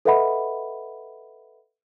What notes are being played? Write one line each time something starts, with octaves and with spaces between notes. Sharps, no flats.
A4 B4 D#5 E5 F#5 B5